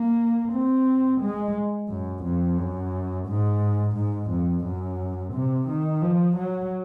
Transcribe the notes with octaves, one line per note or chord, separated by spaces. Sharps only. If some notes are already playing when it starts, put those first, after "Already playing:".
Already playing: A#3
C4
G#3
F#2
F2
F#2
G#2
G#2
F2
F#2
C3
D#3
F3
F#3